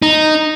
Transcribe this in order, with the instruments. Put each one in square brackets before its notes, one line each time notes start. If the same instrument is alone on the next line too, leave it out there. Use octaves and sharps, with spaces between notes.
[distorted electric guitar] D#4